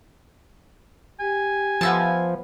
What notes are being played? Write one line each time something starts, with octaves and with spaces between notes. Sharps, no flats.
G4 G#5
F3 B3 E5 A5